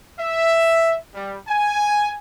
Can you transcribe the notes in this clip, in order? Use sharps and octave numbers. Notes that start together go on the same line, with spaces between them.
E5
G3
G#5